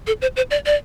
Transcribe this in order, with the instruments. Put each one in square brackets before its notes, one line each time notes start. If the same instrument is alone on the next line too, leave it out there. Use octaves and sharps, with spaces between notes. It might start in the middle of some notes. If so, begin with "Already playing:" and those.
[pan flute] A4
C5
C5
D5
D5